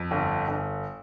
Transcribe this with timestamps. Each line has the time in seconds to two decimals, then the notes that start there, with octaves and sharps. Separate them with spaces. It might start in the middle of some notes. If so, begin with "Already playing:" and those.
Already playing: F2
0.11 G1
0.48 G1